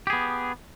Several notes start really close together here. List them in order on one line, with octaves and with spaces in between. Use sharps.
G4 G#4 B3